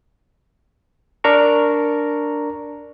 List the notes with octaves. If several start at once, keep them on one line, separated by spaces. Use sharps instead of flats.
D4 A#4 A#5 C#6